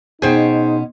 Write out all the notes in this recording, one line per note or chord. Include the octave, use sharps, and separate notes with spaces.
B2 C#4 D#4 G#4 C5 G5